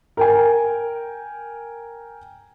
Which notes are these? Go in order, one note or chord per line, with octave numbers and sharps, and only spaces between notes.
A#4 G5 G#5